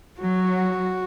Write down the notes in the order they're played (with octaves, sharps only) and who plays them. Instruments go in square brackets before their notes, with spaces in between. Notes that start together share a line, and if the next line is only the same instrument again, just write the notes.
[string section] F#3 [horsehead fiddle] F#4